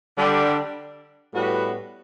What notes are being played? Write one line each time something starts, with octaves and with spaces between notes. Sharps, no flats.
D3 G3 D4
A2 G3 B3 F#4 B4